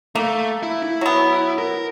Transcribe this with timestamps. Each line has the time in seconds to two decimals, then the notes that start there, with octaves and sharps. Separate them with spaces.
0.15 A3 A#3
0.63 E4
0.83 E4
1.01 F#3 B3
1.58 A#4